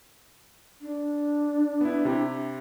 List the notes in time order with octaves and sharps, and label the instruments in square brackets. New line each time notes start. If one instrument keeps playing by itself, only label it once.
[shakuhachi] D4
[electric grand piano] B3 E4
C3 E4 G4